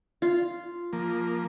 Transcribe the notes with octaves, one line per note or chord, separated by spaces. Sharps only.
F4
F3 A#3